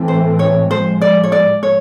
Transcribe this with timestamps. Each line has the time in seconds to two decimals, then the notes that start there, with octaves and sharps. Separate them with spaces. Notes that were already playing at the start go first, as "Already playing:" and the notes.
Already playing: A2 E3 A3 C4
0.08 C5
0.39 C#5
0.70 A2 F3 G#3 C5
1.02 D5
1.23 C#5
1.32 D5
1.63 C#5